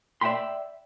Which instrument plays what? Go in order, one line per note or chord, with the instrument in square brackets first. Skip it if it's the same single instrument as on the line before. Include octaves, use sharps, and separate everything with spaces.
[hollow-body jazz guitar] D5 E5 F#5 G5 B5 C6